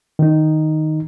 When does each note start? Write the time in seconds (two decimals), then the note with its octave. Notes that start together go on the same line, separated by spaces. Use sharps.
0.19 D#3 D#4